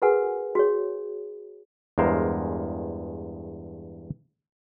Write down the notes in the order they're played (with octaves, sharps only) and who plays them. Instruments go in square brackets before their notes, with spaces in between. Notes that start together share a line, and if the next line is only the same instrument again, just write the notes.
[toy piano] F#4 G#4 A#4 B4 F#5 G#5
F#4 G#4 C#5
[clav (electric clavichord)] E2 G2 G#3 A#4 C5 F5